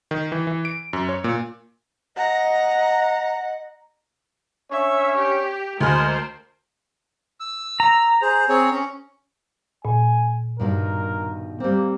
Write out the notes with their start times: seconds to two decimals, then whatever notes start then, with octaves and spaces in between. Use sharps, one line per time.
0.11 D#3
0.32 E3
0.47 E3
0.65 D7
0.93 F#2
1.09 C#5
1.24 A#2
2.17 D#5 F#5 A#5
4.72 C#4 D4 C#5 E5
5.17 G4
5.80 D2 G#3 A#4 C5 F6
7.40 E6
7.80 A#5
8.22 G#4 C5
8.49 C4 G#4 C#5
8.71 C#4
9.85 A#2 G#5
10.60 G2 B2 D#3 A#4
11.60 G3 A#3 C4